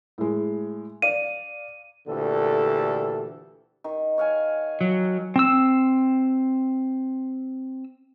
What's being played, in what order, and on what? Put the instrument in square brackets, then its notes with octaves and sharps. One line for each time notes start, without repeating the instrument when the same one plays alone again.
[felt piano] A2 G#3
[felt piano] D5 F5 [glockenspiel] D#7
[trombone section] D2 A#2 D3 E3 G4 A4
[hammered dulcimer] D#3
C#5 F5 G#5
[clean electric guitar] F#3
[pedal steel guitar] C4 E6